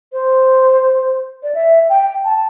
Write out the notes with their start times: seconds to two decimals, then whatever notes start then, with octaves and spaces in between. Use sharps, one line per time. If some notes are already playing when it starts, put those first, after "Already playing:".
0.13 C5
1.43 D5
1.55 E5
1.89 G5
2.25 A5